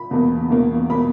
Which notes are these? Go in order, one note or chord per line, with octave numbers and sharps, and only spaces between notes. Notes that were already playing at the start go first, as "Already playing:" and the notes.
Already playing: B5
E2 B2 A#3
E2 B2 A#3
B2 A#3 B5